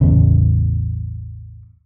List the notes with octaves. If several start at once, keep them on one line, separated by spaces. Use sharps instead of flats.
A1 E2 C#3